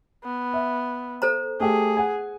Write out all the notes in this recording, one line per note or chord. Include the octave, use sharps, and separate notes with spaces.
B3
E5
A4 C5 A#5
A3 G4 G#4
F#5 G#5